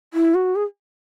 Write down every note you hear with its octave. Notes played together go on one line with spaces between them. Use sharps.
E4
F#4
G#4